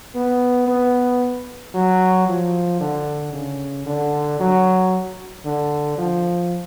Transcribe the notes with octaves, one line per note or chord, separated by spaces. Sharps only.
B3
B3
F#3
F3
D3
C#3
D3
F#3
D3
F3